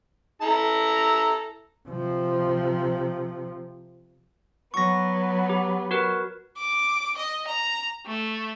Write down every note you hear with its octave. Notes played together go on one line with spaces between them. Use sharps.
E4 A4 A#5
C3 F3
F#3 B3 C#6 A#6
G4
F#4 A#4 B4
D6
D#5
A#5
A3